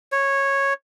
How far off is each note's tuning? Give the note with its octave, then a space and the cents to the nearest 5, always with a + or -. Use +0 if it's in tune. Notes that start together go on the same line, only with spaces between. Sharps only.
C#5 -10